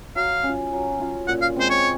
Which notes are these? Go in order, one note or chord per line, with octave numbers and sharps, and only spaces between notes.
F#3 F5
C#4
F4
F#3
C#4 F4
A#2 F#5
F5
G#3 C4 C5
C#5